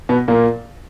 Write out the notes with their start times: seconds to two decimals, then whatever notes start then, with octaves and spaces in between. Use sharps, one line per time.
0.09 B2 B3
0.28 A#2 A#3